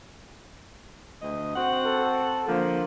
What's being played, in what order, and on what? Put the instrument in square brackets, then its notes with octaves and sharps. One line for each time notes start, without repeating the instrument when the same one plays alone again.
[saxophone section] D2 D#5
C4 F#4 F#5
[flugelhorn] A4
[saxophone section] D3 F3 [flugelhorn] A#3